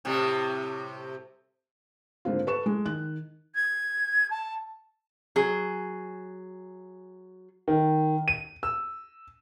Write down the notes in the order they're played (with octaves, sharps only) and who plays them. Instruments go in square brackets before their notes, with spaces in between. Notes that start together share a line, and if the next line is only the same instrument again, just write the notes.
[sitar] A2 C3 G3
[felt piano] G#2 D3 A#3 C4 F4
A4 B4 C#6 E7
G#3
D#3 F#6
[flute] G#6
A5
[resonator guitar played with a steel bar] F#3 G#4
[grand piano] D#3
D#7
E6